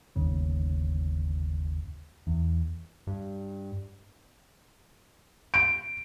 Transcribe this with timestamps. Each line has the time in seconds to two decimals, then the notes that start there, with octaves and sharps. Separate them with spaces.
0.16 G1 D#2 C#3
2.27 E2
3.07 G2
5.54 D7